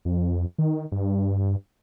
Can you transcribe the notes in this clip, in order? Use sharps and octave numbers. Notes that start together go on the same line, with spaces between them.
F2
D#3
G2